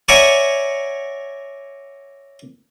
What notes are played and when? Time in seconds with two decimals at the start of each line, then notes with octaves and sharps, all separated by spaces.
0.08 C#5 D5 E5 F#5 G#5 A#5